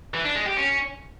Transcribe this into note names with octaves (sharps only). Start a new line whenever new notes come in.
E3
D4
G#3
G4
C#4